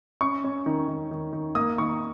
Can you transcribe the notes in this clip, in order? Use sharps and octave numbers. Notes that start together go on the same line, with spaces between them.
C#4 C#6
C#4
D#3
D#3
D#3
D#3
A#3 D#6
D#3 C#6